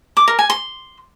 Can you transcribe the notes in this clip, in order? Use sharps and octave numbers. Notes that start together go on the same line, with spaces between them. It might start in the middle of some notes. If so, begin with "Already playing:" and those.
D6
A#4
G#5
C6